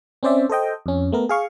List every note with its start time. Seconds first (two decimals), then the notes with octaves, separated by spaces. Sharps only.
0.23 C4 C#4 C5 D5 E5
0.49 A4 C5 D#5 G5
0.86 F2 C#4
1.12 A3 B3 A#4
1.29 G#4 F5 C#6